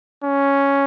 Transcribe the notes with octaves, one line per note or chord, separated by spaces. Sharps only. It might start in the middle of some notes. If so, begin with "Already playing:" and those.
C#4